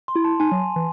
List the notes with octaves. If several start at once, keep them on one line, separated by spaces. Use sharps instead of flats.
C6
E4
A5
D#4 G#5
F#3
E3